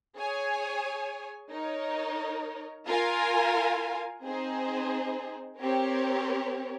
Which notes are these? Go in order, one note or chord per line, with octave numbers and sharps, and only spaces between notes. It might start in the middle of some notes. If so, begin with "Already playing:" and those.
G#4 C#5 G#5
D#4 A#4 C#5
F4 A#4 F5 G#5
C4 D#4 G#4 C5
C4 G4 A#4 C#5